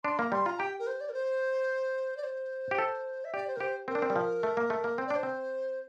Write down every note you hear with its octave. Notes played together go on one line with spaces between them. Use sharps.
D4 C6
A#3 A#5
G3 C6
F4 A#5
G4 G5
A#4
C5
D5
A#4
C5
D5
C5
G4
A4
E5
G4 D5
C5
A#4
G4 C5
C4 A#4
D4
C4
G3
F3
A3
A#3
A3
A#3
C4 C5
D5
D4
C5
C4